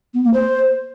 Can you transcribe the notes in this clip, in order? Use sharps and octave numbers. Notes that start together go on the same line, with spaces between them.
B3
A#3
C5